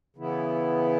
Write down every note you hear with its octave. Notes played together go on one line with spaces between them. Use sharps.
C#3 E3 B3 E4